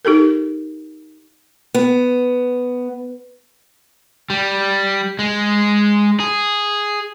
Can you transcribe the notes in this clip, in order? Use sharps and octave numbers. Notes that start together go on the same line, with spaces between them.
D#4 G4 A4 A#4
B3
G3
G#3
G#4